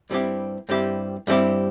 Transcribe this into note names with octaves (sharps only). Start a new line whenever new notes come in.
G2 G3 C4 E4 G4
G2 G3 C4 E4 G4
G2 G3 C4 E4 G4